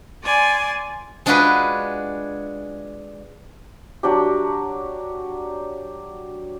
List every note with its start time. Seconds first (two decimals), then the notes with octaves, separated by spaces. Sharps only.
0.23 D5 G#5 C6
1.26 G#3 D4 F4 F#4 G#4 B4
4.03 F#3 D4 G4